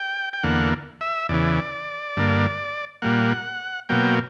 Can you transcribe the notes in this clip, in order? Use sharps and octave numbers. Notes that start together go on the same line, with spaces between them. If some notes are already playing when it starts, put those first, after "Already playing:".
Already playing: G5
G5
E2 D3 A#3 F#5
E5
E2 C#3 E3 D5
G2 D3 A#3
A#2 G3 A#3 F#5
B2 F#3 A#3 G5